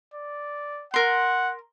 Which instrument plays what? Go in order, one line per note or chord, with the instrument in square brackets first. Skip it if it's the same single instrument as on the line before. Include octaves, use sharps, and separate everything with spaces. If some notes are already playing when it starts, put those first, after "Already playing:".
[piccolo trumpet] D5
[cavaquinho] A#4 C6 [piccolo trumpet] F#5